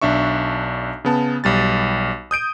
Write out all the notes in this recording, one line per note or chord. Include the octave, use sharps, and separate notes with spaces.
B1 D4 E5 C#6
C#3 B3 A5
B1 G3 A6
D#6 G6 D7 D#7